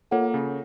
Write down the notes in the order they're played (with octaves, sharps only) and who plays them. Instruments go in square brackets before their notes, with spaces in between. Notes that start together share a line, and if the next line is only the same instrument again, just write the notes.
[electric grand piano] A#3 [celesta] F4 A4 C#5 F#5
[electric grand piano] C#3